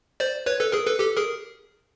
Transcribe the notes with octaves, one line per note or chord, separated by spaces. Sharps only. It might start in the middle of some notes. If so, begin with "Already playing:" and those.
C5 D5
B4 C#5
A4 B4
G#4 A#4
A4 B4
G4 A4
G#4 A#4